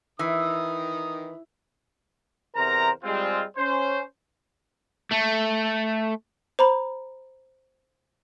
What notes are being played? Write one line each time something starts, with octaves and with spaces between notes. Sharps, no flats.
D#3 E3 D#6
E2 C3 A#4 C5 A#5
G3 G#3 C4 F4
C#4 C5
A3
C5 A#5 B5